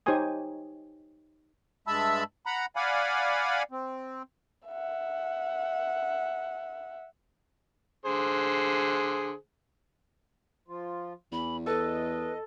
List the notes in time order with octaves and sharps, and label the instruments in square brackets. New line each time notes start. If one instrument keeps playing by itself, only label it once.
[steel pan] D#4 G4 C5 C#5 G#5 D#6
[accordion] G2 G#3 E5 A5 B5 E6
F#5 A#5 B5
D5 F5 F#5 G#5 B5
C4
[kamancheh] E5 F#5
[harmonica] D3 G#4 C5
[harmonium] F3 F4
[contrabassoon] E2 [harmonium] E3 [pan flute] B5
[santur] A4 [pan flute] B4 [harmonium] D#5